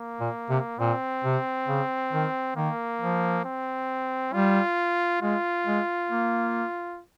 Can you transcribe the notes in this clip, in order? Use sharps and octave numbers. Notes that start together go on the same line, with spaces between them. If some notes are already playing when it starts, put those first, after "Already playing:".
Already playing: A#3
A#2
C3
A#2 C4
C3
C#3
D#3
D#3 A#3
F3
C4
G3 F4
G#3 F4
G#3
A#3